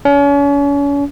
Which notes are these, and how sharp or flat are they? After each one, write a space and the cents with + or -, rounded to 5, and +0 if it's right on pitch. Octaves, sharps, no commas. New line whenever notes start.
C#4 +40